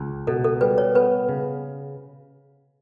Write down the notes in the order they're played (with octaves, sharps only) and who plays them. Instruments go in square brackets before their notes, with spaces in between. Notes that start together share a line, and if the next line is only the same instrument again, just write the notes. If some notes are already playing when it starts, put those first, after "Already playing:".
Already playing: [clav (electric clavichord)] C#2
[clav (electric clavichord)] B2 [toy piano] A4
[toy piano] A4
[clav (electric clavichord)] G3 [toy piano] B4
[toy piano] C#5
[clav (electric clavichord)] B3 [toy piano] B4
[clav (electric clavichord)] C#3